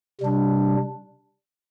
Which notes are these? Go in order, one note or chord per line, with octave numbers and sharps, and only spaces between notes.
C3 G3 D4